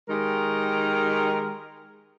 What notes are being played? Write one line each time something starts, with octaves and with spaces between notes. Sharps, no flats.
D#3 G#3 G4 A#4